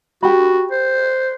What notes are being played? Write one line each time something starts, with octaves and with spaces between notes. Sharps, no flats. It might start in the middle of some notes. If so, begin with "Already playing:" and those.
F#4 G4 B5
C5